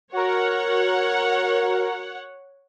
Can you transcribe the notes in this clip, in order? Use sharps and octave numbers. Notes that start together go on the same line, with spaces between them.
F#4 A#4 C#5 F#5